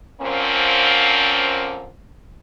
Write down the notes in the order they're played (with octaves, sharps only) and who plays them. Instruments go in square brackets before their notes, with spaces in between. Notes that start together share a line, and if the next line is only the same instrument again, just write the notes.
[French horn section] A#2 D3 F3 A#3 C4 C#4